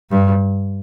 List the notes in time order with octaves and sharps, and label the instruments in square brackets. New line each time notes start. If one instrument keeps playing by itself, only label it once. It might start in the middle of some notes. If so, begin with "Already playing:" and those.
[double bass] G2